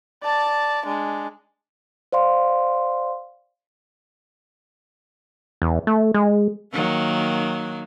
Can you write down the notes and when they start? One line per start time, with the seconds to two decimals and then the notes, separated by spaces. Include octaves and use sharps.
0.23 D5 A5
0.86 G#3 D4
2.12 C5 D5 F5 C6
5.62 E2
5.87 A3
6.14 G#3
6.73 D#3 F#3 A#3